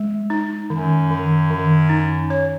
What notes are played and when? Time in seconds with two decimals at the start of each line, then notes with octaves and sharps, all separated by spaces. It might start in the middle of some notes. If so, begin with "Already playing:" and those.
Already playing: G#3
0.30 D#4
0.70 F#2 D#3
1.10 D#3
1.50 D#3
1.89 D#4
2.30 C#5